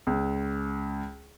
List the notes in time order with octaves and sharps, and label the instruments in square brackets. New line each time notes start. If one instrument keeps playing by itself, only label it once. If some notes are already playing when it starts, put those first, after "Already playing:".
[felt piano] C#2